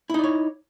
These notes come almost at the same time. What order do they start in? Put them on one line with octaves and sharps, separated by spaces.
E4 D#4 D5 C#5